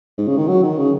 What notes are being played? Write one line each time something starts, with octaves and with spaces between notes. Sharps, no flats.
G#2
C#3
D#3
F#3
D#3
C#3